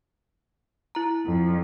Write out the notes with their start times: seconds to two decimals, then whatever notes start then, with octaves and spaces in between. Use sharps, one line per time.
0.95 E4 A#5
1.26 F2